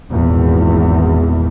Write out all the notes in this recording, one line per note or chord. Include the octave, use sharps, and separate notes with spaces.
G#1 E2 A#2